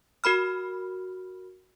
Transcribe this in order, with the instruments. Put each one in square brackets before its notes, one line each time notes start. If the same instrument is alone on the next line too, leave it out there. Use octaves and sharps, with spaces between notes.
[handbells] F#4 A#4 B5 F6